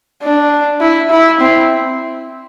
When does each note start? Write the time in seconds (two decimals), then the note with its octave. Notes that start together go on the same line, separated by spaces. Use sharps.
0.23 D4
0.81 E4
1.11 E4
1.41 C4